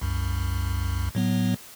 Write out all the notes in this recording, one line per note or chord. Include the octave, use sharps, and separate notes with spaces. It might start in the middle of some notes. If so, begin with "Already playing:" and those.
C2 F#2
A2 F#3 B3